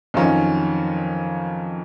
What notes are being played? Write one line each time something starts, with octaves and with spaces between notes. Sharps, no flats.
F2 D#3 F#3 C#4 F4